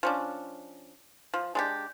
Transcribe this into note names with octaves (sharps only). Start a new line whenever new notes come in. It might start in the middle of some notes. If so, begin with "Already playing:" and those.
F3 C#4 D4
F3
G#3 D4 G4